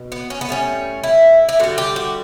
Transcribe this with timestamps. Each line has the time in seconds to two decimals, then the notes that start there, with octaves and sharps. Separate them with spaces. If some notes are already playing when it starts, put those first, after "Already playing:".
Already playing: B2
0.12 B3
0.30 C#4
0.41 B3
0.49 A2 G3 C#4
1.04 E4
1.49 E4
1.60 D3 G3 F#4
1.78 G4
1.96 F#4